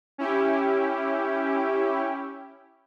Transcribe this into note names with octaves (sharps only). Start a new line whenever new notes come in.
C#4 E4 G4